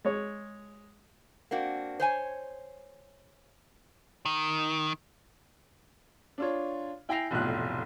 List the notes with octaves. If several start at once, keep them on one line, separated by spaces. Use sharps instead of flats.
G#3 C#5
A#3 C4 D4 F#4
C5 C#5 G#5
D#3
D4 F4 C#5
E4 G5 G#5 A#6 C7 F7
F1 B1 A2 F4 F#6